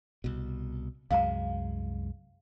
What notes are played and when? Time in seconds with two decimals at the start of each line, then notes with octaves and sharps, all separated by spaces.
0.24 C2 B2
1.11 C2 F#2 G#3 F5 A#5